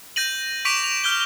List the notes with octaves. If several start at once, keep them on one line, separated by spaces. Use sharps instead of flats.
G6 A#6 D#7 F#7
C#6 D6 B6 D7 D#7 F7
F7
F6 G6 G7